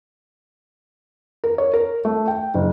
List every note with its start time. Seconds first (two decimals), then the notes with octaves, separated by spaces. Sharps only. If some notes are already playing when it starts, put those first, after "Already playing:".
1.44 A#4
1.58 C#5
1.73 A#4
2.05 A3
2.28 G5
2.54 F#1